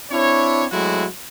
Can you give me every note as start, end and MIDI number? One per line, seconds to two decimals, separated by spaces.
0.11 0.67 60
0.11 0.67 62
0.11 0.67 64
0.11 0.67 73
0.72 1.06 54
0.72 1.06 56
0.72 1.06 57
0.72 1.06 60
0.72 1.06 64
0.72 1.06 66